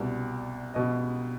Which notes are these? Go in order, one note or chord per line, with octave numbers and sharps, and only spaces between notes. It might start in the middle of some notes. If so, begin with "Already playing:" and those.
Already playing: C2 B2 D5
B2 D#5